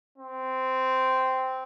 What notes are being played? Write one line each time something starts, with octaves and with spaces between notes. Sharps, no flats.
C4